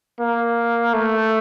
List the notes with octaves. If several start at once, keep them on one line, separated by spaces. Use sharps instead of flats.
A#3
A3